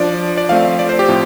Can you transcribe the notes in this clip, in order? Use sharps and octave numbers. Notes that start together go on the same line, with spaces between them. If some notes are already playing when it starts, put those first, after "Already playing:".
Already playing: F3 D4 D5
D5
F3 A3 C4 F5
D5
C5
G4
A2 F3 C4